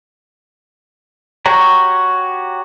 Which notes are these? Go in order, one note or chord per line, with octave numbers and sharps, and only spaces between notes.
F#4 G4 C#5 A#5